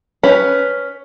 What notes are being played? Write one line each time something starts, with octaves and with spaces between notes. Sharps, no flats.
C#4 B4